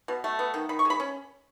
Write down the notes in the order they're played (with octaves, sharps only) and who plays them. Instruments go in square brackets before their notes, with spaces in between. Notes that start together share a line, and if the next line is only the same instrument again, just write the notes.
[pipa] B2
A3
B3
D#3
D#3 B5
C#6
G#3
B5
C#4